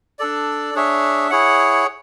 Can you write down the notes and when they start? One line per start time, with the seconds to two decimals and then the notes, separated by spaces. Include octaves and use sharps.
0.19 D4 A4 D5
0.74 D4 G#4 C#5 E5
1.30 E4 G#4 C#5 F#5